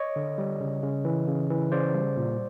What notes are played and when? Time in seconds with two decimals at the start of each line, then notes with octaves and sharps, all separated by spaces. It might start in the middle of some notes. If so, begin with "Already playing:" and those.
Already playing: C#5 D#5
0.16 D3
0.38 G3
0.60 C#3
0.83 C#3
1.05 E3
1.28 C#3
1.50 E3
1.72 C#3 C5 D5
1.95 G3
2.17 A#2